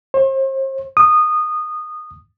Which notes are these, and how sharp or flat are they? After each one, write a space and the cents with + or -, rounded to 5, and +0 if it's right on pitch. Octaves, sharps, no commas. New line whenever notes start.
C5 +40
D#6 -20